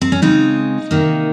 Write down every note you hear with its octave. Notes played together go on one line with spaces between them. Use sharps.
C4
C#4
C#3 G#3 C4 D#4
C3 D#3 A#3